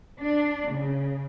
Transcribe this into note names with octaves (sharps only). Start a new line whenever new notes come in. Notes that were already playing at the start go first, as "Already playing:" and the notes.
D4
C#3